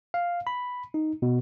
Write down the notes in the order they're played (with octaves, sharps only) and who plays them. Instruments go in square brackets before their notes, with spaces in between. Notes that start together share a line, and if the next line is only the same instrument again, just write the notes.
[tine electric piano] F5
B5
D#4
B2